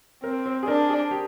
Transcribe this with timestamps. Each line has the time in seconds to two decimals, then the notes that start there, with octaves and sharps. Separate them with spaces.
0.24 C4 A#4
0.46 C5
0.63 G#4
0.68 D4 A#4
0.89 G#4
1.11 G4